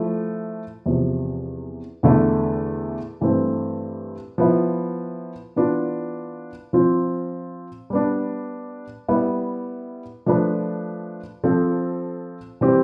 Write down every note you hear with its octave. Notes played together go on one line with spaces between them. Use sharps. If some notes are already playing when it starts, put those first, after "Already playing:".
Already playing: F3 A3 E4
E2 C3 F3
E2 D3 A3 E4
G2 E3 A3 C4
F3 B3 E4
E3 B3 D4 F4
F3 C4 F4 C5
G3 B3 D4
G3 B3 E4
F3 A3 D4 F4 B4
F3 C4 F4 A4 C5
E3 G3 C4 G4